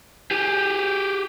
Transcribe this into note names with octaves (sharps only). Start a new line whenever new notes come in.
G4 G#4